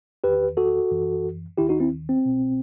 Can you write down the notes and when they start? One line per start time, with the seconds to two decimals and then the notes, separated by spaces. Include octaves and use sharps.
0.24 E2 D#3 G4 B4
0.57 F#4 A4
0.91 F#2 E3
1.58 D#2 D#3 E4 G4
1.69 D#4 F#4
1.80 C4 E4
2.09 C4
2.25 C2 B2